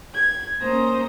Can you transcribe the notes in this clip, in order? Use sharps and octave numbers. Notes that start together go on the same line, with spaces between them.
G#6
A#3 C#4 C5 A#5 D#6